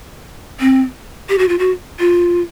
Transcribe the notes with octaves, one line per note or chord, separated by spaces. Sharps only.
C4
G4
F#4
F4
F#4
F4